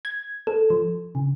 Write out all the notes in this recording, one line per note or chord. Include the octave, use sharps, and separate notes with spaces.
G#6
A4
F3
C#3